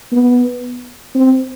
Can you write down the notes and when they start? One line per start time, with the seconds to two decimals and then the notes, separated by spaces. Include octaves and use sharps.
0.12 B3
1.15 C4